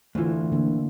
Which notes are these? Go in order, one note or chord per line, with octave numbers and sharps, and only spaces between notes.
D2 E3 A3 F4
D3 A#3